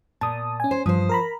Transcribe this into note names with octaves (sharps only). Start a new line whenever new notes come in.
A#2 A5 D#6
C#4 G#5
C5
G2 F3 C5 D#6
A#4 A#5 B5